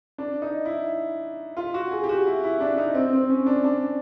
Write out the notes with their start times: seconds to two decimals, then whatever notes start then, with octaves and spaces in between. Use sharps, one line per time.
0.18 D4
0.42 D#4
0.65 E4
1.57 F4
1.74 F#4
1.91 G#4
2.04 G4
2.09 F#4
2.26 E4
2.44 E4
2.60 D4
2.78 D#4
2.95 C4
3.13 C4
3.30 C#4
3.46 D4
3.64 D4